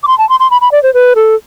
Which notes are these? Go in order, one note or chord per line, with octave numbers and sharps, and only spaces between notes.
D6
C6
A5
C6
C6
B5
B5
D5
C5
B4
A4